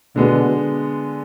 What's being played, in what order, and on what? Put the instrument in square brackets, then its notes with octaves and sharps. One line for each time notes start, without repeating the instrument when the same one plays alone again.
[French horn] B2 [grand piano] D3 G#3 B3